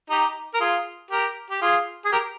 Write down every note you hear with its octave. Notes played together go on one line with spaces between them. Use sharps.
D#4 G4
A#4
F4 G#4
G4 A#4
G4
F4 G#4
G#4
G4 A#4